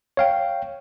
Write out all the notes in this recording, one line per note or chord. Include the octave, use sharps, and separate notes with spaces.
C#5 F5 G5